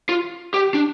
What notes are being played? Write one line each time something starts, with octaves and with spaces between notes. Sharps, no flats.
F4
G4
D4